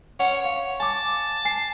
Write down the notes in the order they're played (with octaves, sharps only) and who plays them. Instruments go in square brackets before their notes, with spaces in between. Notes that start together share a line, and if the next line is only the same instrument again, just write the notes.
[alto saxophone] C#5 [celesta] F#5
[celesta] F5
[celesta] G#5 D6 [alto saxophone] A5
[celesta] G#5 C7